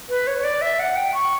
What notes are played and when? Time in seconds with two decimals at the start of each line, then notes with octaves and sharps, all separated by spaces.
0.09 B4
0.27 C#5
0.38 C#5
0.44 D5
0.62 E5
0.79 F#5
0.96 G5
1.14 C#6